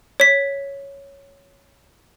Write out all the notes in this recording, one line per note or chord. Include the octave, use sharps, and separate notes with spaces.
C#5 B6